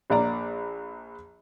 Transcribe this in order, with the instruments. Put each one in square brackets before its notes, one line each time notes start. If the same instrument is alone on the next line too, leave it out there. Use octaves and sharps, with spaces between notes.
[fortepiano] A#1 A#3 D5 A#5